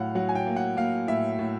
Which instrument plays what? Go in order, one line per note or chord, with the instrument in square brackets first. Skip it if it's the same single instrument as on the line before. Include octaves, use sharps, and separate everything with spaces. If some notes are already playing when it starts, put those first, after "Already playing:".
Already playing: [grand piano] A2 F#3 F5 F#5
F#3 F#5
G#5
G5
A#3
F#5
A#3 F5
A2 E5
A2